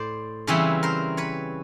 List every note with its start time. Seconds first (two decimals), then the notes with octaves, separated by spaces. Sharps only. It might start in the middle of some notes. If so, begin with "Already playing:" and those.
Already playing: A2 C5 D5
0.47 C#3 E3 G3 C4 B4 C#5
0.83 A#4 C5
1.17 B4 C#5